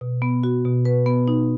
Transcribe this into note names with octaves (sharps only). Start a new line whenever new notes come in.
B2
B3
F#4
B2
B4
B3
D#4